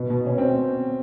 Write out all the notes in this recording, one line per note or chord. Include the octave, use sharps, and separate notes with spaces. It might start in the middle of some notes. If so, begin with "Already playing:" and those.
Already playing: B2
B2
B2 C#4
C4